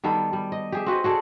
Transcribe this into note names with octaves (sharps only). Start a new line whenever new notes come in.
D#3 G3 B3 A4
G3
D#5
G4 G#4 E5
C4 F#4 B4 D#5
F#4 G#4 A4 D5